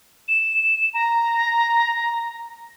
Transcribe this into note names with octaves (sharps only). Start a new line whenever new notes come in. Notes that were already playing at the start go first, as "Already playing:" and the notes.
E7
A#5